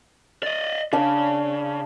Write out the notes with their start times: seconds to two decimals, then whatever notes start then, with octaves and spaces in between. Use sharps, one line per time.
0.43 D5 D#5
0.93 C#3 D4 F5